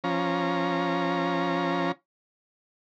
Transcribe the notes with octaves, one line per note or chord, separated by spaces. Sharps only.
F3 C#4 A#5